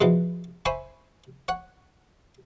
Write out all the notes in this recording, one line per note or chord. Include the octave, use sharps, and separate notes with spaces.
E2 B2 E3 F3
C5 C#5 E5 G#5 B5
C#5 F#5